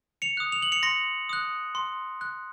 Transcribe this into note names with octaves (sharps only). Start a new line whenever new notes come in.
C#7 F7
D#6 F#6
F7
F#7
C#7 F7
C6 A#6 C#7
D#6 F#6
C6
F#6